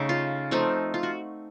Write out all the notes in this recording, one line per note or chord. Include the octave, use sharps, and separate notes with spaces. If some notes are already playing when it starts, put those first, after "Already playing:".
Already playing: C#3 A3 D#4
F4
F3 A3 C4 D#4
F4
F#4